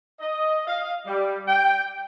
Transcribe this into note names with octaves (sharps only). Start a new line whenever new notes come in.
D#5
F5
G3
G5